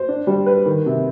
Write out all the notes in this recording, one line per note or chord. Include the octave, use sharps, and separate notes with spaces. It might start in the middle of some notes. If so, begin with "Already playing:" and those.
Already playing: C5
D4
G3
B4
D#3
C3